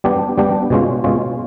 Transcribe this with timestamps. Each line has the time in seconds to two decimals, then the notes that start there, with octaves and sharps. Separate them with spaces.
0.04 G3 B3 D4 G4
0.38 G3 B3 D4 G4
0.70 B2 G#3 C#4 F4
1.04 B2 G#3 C#4 F4